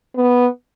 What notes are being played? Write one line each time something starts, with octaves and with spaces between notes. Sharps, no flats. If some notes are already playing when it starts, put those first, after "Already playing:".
B3